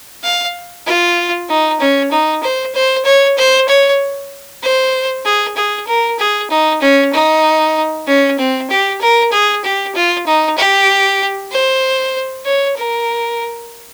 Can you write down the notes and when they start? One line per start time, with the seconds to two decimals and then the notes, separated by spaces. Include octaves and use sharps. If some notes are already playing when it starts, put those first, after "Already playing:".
0.24 F5
0.87 F4
1.49 D#4
1.80 C#4
2.12 D#4
2.43 C5
2.75 C5
3.05 C#5
3.38 C5
3.68 C#5
4.63 C5
5.25 G#4
5.57 G#4
5.87 A#4
6.19 G#4
6.50 D#4
6.82 C#4
7.14 D#4
8.07 C#4
8.39 C4
8.70 G4
9.01 A#4
9.32 G#4
9.64 G4
9.95 F4
10.26 D#4
10.58 G4
11.52 C5
12.45 C#5
12.77 A#4